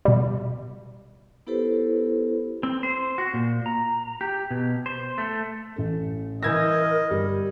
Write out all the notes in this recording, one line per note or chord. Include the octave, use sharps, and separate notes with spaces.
B2 G3
B3 E4 G4 A4 B4 C5
C4
C5
F#4
A#2
A#5
G4
B2
C5
A3
A1 C#4 A4
E3 A#4 D#5 E6 G6 G#6 A#6
G1 G3